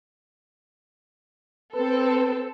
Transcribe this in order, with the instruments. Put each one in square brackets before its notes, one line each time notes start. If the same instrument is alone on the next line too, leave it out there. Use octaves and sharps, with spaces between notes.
[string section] C4 A4 [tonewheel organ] B4